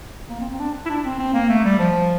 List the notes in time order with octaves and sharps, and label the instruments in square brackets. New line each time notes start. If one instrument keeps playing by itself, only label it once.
[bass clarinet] A#3
C4
C4
D4
E4
D4
C4
C4
A#3
A3
G3
F3